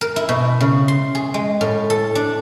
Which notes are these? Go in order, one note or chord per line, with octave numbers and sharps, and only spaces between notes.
A#4
E4
B2
C#3
C6
G#4
G#3
A2
A4
D4